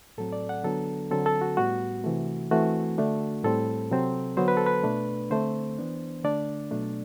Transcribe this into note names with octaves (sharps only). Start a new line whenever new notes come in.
A2 F#3 C4 A4
D5
F#5
D3 F#3 B3 D4 A4
D3 F#3 C4 A4
A4
F#4
A2 G3 B3 F#4
C3 E3 A3
E3 A3 C4 F#4
D3 A3 D4
A2 G3 C4 A4
C3 F#3 C4
D3 F#3 B3 C5
B4
A4
B4
B2 A3 D4
D3 A3 C4 C5
E3 B3 D4
D3 A3 D4 D5
B2 F#3 A3 D4